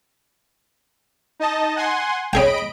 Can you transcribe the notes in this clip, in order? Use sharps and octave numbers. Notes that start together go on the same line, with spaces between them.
D#4 D#5 A5
F#5 G#5 C6
C#4 G#4 D#5 G5 B5 D7